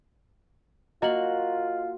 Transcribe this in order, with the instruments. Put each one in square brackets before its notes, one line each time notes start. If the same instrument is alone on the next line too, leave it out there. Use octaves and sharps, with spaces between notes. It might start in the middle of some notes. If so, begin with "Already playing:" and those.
[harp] A#3 F#4 A#4 [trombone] F4 [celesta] D#5 F#7